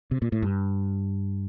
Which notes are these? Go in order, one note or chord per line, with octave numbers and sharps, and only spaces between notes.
C3
A#2
A2
G2